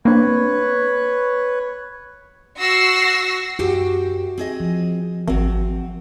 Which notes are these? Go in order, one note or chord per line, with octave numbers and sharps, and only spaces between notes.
A#3 C4 D4 B4 C#5
F#4 E6 A#6 C7
F#2 F#4 G4 G5
C4 G#4 D#5
F3
G#1 F#3 C4